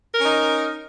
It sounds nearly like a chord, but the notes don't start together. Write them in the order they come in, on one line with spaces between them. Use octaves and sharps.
A#4 C#4 D#4